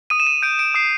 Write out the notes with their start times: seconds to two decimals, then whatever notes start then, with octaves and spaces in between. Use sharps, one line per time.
0.10 D#6 D#7
0.20 E7
0.27 D#7
0.42 G6 D7
0.59 D7
0.74 D#6 C7